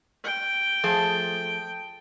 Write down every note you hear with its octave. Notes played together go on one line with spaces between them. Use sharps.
G5
F3 A3 G#4